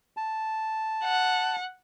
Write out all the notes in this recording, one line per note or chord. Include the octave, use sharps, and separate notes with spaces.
A5
F#5